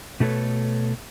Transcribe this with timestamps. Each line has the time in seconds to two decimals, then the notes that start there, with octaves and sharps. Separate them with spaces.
0.20 B2 A3 D4 A4 B4 C#5